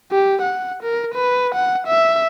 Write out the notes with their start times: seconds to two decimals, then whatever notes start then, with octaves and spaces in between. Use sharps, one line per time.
0.12 G4
0.42 F#5
0.83 A#4
1.14 B4
1.55 F#5
1.87 E5